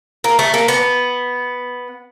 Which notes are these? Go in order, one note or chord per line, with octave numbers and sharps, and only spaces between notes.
A#3
A3
A#3
B3